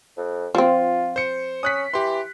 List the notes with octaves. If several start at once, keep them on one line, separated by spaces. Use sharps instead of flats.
F2
F3 C4 F4
C5 C#7
C#4 D#6 F#6 B6
E3 G4 C6